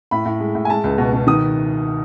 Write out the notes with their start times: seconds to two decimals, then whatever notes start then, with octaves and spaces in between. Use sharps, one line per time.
0.11 A2 B5
0.25 A2
0.40 G#3
0.55 A2
0.65 G#5
0.70 G#3 A5
0.84 C#2
0.98 B2
1.13 B2
1.27 D#3 D#6